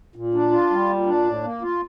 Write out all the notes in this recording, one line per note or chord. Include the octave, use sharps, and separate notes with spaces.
A#2
D4
F4
G3
A#2
D4
A2
A#3
F4